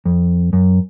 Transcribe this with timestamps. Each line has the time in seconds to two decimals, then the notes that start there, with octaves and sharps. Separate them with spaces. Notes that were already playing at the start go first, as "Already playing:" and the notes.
0.05 F2
0.53 F#2